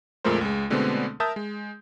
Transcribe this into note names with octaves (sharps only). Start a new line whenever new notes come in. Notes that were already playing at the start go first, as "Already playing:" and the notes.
F2 A#2 G#3 A3 A#4 C5
C#2 G#3
B2 D3 G#3 A3 B3 C4
A#4 E5 A5 D#6 G6
G#3